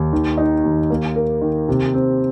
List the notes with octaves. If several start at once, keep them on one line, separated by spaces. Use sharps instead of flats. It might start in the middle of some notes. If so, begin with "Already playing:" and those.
Already playing: D#2
D#3
D#4
D#2
A#3
A#4
D#3
C3
C4